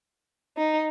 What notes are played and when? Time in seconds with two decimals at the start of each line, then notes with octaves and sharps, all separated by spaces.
0.57 D#4